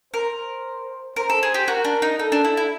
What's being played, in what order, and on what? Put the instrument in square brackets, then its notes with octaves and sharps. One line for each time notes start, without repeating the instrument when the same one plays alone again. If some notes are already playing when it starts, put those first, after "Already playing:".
[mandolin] A#4 [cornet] C5
[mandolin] A#4 [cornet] C5
[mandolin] A4
G#4
G4
[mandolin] F#4 [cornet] A#4
[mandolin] D4
D#4
[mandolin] D#4 [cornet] A4
[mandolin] D4
E4
E4